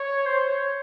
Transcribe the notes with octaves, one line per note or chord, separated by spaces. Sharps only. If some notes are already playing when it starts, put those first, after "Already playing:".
Already playing: C#5
C5
C#5